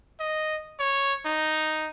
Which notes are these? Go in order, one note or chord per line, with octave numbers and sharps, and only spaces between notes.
D#5
C#5
D#4